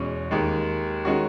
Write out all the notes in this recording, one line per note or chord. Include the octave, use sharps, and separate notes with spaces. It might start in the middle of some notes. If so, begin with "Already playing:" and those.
Already playing: E2 B2 G#3 C#4
D#2 D#3 G#3
D#3 G#3 C#4 F#4